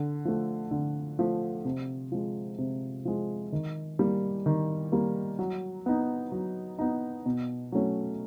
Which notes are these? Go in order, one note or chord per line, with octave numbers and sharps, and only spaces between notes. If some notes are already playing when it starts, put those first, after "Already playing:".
Already playing: D3
F3 A3
D3
F3 A3
C3
F3 G#3
C3
F3 G#3
D#3
G3 A#3
D#3
G3 A#3
F#3
B3 D#4
F#3
B3 D#4
B2
F#3 A3 C#4